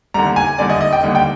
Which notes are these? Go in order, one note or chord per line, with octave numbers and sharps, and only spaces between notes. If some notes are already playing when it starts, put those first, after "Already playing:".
D#2 D3 G3 A#5
G#5
D#2 D3 G3 D5
D#5
D#5
G5
D#2 D3 G3
G5